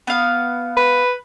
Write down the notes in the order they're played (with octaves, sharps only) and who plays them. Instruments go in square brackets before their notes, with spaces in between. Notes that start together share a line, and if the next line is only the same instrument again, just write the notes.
[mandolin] B3 F5
[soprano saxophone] B4